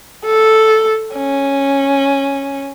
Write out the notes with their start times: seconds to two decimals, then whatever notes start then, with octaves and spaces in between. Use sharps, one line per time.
0.25 A4
1.16 C#4